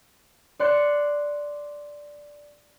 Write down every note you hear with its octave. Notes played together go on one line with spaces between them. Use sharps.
D5 C6 F#6 C#7